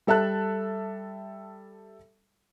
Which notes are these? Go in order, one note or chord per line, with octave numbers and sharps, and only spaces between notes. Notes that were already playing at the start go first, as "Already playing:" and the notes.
G3 A4 E5 A5 F#6